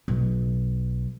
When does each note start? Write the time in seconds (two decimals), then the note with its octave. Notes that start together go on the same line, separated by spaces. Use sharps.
0.08 B1